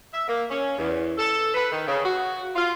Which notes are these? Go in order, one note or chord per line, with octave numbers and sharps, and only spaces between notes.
E5
A#3
C#4
E2
A4
B4
D#3
C#3
F#4
F4